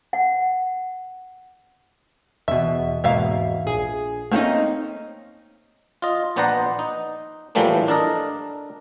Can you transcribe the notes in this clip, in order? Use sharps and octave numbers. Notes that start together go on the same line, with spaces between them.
F#5
E2 B2 E5
E2 G#2 B2 A#3 E5 F5
A#1 G#4
A3 A#3 C4 C#4 D#4
F4 D#5
A#1 B3 C5 D5 F#5 A#5
D#4
A2 E3 F3 G3 A3 A#3
D4 A4 A#4 D#5